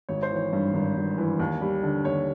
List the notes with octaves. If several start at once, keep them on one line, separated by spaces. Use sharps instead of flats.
G#1 C#5
C5
E3
C#5
G2
G#1
G#1
E3
D#2
G3
D3
D#2 C#5